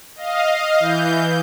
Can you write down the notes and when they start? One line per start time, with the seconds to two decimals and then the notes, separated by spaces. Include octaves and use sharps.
0.16 D#5 F5
0.80 E3 G6